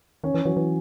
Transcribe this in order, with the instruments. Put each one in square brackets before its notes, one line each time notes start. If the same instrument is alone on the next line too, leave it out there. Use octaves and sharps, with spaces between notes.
[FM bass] D#3 [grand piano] C#4
[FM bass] E3
[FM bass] E3 [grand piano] F#3
[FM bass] E3